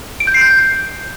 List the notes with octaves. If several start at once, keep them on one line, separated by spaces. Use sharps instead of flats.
D7
G6
C7
G6